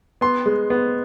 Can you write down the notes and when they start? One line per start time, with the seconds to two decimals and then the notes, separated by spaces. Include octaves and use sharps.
0.21 B3 C6
0.46 G#3
0.70 B3